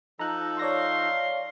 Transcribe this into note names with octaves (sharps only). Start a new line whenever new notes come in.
F3 D#4 A4 A#5 F#6
C#5 D5 F5 C6 A#6